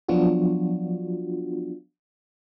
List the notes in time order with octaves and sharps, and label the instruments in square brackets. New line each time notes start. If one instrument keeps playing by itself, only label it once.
[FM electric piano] F3 F#3 B3 D4 F4 F#4